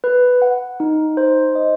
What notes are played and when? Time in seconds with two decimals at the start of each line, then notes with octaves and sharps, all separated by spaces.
0.04 B4
0.42 F#5
0.80 D#4
1.17 C5
1.55 D#5